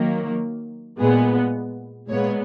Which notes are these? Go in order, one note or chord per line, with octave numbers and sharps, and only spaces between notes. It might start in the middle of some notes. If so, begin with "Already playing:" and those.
Already playing: D#3 F#3 A#3
A#2 G#3 B3 G#4
A#2 G#3 B3 C#5